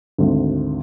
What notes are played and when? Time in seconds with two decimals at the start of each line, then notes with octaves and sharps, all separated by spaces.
0.18 G#1 D2